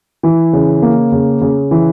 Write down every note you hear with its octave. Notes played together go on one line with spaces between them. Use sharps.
E3
C#3
A#3
C#3
C#3
E3